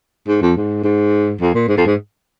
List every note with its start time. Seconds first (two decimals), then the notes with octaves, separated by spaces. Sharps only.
0.27 G#2
0.42 F2
0.56 G#2
0.84 G#2
1.40 F2
1.54 A#2
1.68 G#2
1.77 F2
1.86 G#2